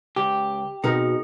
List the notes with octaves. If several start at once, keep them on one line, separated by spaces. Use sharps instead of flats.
C#2 G4 G5
B2 C4 D#4 G#4 A#4